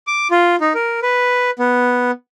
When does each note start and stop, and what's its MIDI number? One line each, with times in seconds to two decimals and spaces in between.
0.07 0.28 86
0.31 0.56 65
0.61 0.73 63
0.74 1.00 70
1.02 1.50 71
1.59 2.11 59